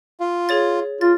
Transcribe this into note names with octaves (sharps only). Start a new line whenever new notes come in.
F4
G#4 C#5 A6
F4 A6